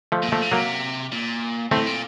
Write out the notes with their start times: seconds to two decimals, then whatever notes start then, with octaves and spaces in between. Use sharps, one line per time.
0.12 F3 A3
0.23 A#2
0.32 F3 A3
0.42 C#3
0.52 C3 F#3 A#3
1.12 A#2
1.71 A2 A3 C4
1.86 A#2